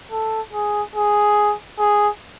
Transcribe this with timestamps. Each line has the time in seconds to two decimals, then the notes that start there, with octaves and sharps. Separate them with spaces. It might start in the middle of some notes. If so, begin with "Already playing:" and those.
0.12 A4
0.53 G#4
0.96 G#4
1.79 G#4